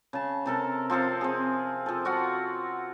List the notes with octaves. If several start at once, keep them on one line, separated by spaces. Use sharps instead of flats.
C#3 A5
C3 A4 A#4
F3 C4 A4 F5
C4 G#4
F3 A4
F4 F#4 F5 F#5